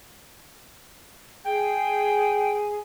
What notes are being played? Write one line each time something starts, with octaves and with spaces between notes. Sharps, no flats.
G#4 G5